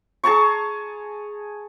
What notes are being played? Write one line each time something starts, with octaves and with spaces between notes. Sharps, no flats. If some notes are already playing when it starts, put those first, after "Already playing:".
G#4 A5 A#5 C#6